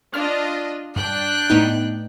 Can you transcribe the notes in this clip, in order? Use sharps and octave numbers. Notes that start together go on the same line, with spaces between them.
D4 F4 D#5 F6
G2 D4 G5 F#6
A2 B3 D#4